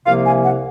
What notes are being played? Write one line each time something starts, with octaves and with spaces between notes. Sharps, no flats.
C2 C3 F3 A#3 F5
G#5
F#5